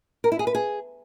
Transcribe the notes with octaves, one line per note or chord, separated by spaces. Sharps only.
A#4
E4
G#4
B4
G#4